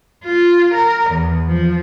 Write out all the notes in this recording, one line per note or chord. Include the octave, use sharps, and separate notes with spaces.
F4
A#4
E2
F3